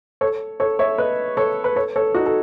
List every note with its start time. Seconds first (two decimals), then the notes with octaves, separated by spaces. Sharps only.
0.21 A4 C#5
0.60 A4 C#5
0.79 C#5 E5
0.98 B4 D#5
1.37 A4 C#5
1.64 B4
1.76 A4 C#5
1.96 A4 C#5
2.15 D#4 F#4
2.26 A4